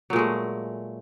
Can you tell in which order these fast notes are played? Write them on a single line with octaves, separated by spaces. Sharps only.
F#3 A#2 G#3 A3